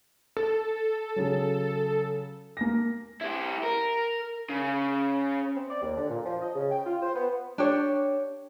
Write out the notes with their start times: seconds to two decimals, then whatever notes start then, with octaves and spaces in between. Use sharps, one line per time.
0.37 A4
1.16 C#3 F#3
2.57 A#3 A#6
3.21 E4 G4
3.63 A#4
4.49 C#3
5.56 C4
5.70 D5
5.82 D#2
5.96 D3
6.09 A#2
6.25 F3
6.41 D#5
6.55 C#3
6.71 G5
6.85 F4
7.01 C5
7.15 B3
7.58 D4 G4 C#5